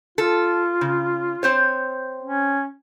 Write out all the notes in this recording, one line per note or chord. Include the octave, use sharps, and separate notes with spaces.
F4 A4
C#3
C4 C5 C#5
C#4